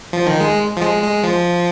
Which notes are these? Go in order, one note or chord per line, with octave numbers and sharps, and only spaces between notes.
F3
D#3
G#3
F3
G#3
G#3
F3